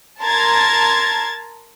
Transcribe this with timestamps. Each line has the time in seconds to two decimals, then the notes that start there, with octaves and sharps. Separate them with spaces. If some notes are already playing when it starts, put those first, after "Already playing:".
0.20 A#4 A5 A#5 C6 G#6 A6